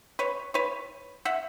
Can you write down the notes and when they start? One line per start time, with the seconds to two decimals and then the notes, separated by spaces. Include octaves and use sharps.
0.19 B4 C#5
0.54 B4 C#5
1.25 E5 F#5